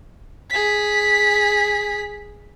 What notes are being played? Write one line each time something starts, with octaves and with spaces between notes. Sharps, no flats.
G#4 B6